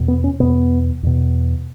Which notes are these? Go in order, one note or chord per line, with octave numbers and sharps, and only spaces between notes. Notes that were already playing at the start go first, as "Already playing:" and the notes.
Already playing: E2 B2
B3
C#4
E2 B2 B3
E2 B2